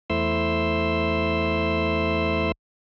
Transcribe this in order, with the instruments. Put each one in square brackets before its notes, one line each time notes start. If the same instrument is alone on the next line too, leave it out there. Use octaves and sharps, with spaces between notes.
[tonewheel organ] E2 A3 E4 C5 C6 E6